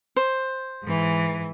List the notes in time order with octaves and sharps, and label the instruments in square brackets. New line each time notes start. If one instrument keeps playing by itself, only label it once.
[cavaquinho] C5
[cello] G#2 E3